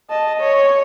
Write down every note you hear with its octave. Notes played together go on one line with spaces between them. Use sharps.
D#5 A5
C#5